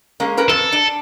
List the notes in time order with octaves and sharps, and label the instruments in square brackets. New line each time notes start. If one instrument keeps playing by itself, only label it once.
[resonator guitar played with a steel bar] G#3 A#3 C#4
C#4 A#4 B4
[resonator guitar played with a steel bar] F2 [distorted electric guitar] A4
[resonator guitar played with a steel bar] D4